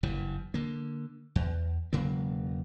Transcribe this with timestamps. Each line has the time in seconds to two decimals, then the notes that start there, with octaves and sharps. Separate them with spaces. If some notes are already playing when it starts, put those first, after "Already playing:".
0.03 F#1 G2 E3
0.54 D3 A#3
1.36 E2
1.93 E1 C#3 F#3 A#3